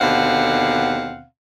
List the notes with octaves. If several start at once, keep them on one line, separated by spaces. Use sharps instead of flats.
D#2 B2 D3 C4 F5 F#5